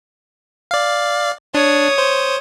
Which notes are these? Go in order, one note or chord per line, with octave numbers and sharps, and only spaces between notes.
D5 F5
D4 C#5 D#6
C5